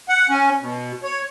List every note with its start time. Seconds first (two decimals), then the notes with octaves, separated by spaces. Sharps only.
0.09 F#5
0.30 C#4
0.61 B2
1.03 C#5